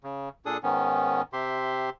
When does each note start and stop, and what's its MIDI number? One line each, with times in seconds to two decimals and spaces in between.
0.04 0.29 49
0.46 0.57 46
0.46 0.57 62
0.46 0.57 68
0.46 0.57 69
0.46 0.57 87
0.63 1.22 44
0.63 1.22 51
0.63 1.22 59
0.63 1.22 61
1.33 1.90 48
1.33 1.90 67
1.33 1.90 76
1.33 1.90 84